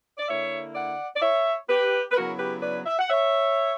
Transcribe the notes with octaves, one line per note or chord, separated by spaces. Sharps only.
D5
D3 A#3 E4 C#5 E5
D5 F#5
D5
C#5 E5
G4 B4
B4
C#3 F#3 B3 E4 F#4 A#4
G4 B4
B4 D5
E5
F#5
C#5 E5